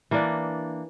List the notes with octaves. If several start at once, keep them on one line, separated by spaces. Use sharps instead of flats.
E3 A#3 D4